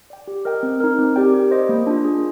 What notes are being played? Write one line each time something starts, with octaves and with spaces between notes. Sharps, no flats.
D5 G5
G4
A#4 D#5 G5
C4
D#4 A#4
C4
G4 D5 G5
G4
C5 D#5
A#3
D4 F4
G#4